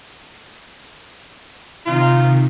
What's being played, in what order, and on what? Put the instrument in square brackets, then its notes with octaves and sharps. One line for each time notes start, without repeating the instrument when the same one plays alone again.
[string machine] C3 D#3 [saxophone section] D#4 F4